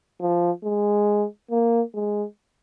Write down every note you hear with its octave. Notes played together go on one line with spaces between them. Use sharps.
F3
G#3
A#3
G#3